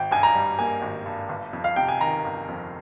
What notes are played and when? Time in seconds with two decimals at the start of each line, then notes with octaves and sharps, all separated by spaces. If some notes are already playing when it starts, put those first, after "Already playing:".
Already playing: G#1 G5
0.11 G2 G#5
0.23 A#5
0.35 G3
0.59 A#3 G#5
0.82 G#1
1.06 G2
1.29 G1
1.53 F2
1.64 F5
1.76 C3 G5
1.88 G#5
2.01 D#3 A#5
2.24 G1
2.48 F2